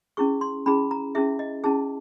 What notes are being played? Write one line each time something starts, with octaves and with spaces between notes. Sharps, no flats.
C#4 E4 G#4 C#6
C6
C#4 E4 G#4 B5
A#5
C#4 E4 G#4 E5
D#5
C#4 E4 G#4 A5